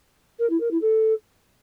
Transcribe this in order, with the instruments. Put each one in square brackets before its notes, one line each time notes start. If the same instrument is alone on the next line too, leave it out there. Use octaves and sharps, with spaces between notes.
[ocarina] A#4
E4
A#4
E4
A4